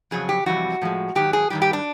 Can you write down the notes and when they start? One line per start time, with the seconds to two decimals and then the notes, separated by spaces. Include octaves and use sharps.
0.11 F2 C#3 F#3 G#4
0.29 G4
0.46 F2 C3 E3 G3 F#4
0.82 A2 F3 G#3
1.15 G#2 D#3 F#3 G4
1.33 G#4
1.50 G2 D#3 G3 G4
1.62 G4
1.73 D4